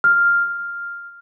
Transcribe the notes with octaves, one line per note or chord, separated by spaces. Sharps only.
F6